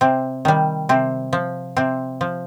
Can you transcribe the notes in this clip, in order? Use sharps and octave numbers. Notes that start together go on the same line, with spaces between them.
C3 C4
D#3 G3
C3 C4
F3
C3 C4
F3